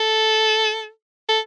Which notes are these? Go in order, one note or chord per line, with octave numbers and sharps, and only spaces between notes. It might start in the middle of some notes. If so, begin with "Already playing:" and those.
Already playing: A4
A4